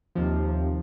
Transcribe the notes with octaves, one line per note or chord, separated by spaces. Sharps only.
D#2 C3 F3